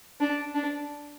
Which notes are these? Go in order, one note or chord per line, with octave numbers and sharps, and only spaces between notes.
D4
D4